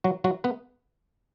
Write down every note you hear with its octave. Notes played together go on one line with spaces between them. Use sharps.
F#3 F#4
F#3 F#4
B3 B4